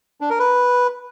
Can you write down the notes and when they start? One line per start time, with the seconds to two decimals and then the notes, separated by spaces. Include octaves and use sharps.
0.21 D4
0.30 A#4
0.39 B4